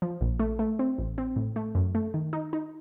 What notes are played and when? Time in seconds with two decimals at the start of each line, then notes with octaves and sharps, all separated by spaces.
0.02 F3
0.21 A#1
0.39 A3
0.59 A3
0.79 C4
0.98 A1
1.18 C4
1.36 A2
1.56 A3
1.75 F#2
1.95 A3
2.14 D#3
2.33 D#4
2.53 D#4